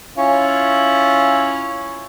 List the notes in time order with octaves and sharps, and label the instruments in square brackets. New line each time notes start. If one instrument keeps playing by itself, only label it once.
[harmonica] C#4 E4 F4